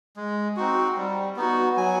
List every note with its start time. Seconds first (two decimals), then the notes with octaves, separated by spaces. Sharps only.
0.16 G#3
0.56 C4 D#4 F#4
0.97 G3
1.36 B3 D#4 F#4
1.76 F#3 G#5